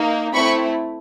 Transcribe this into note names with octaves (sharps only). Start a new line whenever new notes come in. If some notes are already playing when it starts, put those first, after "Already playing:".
Already playing: A#3 D#4
A3 C4 E4 B5 C#6